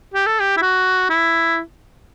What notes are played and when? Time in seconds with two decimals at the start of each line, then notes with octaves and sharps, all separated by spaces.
0.14 G4
0.26 A4
0.40 G4
0.57 E4
0.62 F#4
1.10 E4